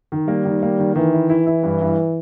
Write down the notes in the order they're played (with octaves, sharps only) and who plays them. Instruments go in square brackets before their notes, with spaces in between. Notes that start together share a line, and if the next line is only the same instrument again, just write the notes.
[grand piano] D#3
[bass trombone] G3 [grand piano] A#3
[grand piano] D#3
A#3
D#3
[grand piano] D#3 [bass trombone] E3
[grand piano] E4
E4
E4
G2
G2